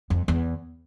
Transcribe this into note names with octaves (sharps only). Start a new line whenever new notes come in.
F2
E2